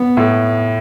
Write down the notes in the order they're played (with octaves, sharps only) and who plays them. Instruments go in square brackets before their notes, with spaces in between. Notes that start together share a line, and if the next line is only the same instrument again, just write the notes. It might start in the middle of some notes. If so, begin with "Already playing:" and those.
Already playing: [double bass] B3
[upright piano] A2